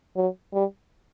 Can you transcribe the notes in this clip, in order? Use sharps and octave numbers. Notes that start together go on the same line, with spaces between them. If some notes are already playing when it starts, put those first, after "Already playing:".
F#3
G3